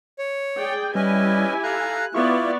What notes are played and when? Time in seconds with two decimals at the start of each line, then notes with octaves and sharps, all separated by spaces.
0.19 C#5
0.58 G#4 D5 G5
0.95 G3 C#4 E4 G4 B4 D#5 G#5
1.63 A4 F5 A#5 F#6
2.14 B3 E4 F4 D5 C#6